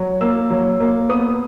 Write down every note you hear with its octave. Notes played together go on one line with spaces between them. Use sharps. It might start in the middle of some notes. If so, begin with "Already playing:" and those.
Already playing: F#3
A#3 E6
F#3
A#3
B3 D#6